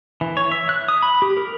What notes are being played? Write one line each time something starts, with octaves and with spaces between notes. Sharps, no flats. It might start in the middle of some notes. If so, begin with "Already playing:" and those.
E3
C#5
E5
F#6
D#6
B5
G4
A#4